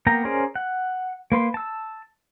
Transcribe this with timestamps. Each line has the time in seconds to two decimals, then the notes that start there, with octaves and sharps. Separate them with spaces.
0.07 A#3 B3 A#4 G5 A#5
0.25 C#4 G#4 A#4 C5 D5
0.56 F#5
1.32 A#3 B4 C6
1.54 A5 E6